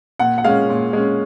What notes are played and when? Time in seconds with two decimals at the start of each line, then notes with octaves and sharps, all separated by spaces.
0.19 A#2 F#5
0.38 F#5
0.44 G#3 C#4 F5
0.69 A#2
0.93 G#3 C#4